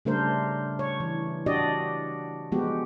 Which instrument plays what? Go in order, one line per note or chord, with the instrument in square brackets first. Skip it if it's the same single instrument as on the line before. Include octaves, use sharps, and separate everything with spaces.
[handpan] C#3 G3 A3 D4 A#4 C5
C#5
E3
D4 F#4 G4 D5 D#5
F3 G#3 B3 F#4 G4